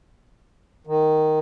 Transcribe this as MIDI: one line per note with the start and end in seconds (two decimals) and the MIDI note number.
0.87 1.39 51